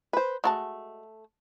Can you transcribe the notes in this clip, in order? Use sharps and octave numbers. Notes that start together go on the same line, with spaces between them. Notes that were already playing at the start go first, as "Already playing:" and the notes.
B4 C5
G#3 A3 F#4 A5